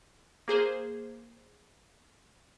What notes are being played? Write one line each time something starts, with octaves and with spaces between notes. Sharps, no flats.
A#3 G#4 C5